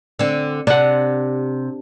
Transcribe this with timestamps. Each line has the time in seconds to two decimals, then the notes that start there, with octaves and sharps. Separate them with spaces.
0.19 D3 C4
0.67 C3 D4 F#5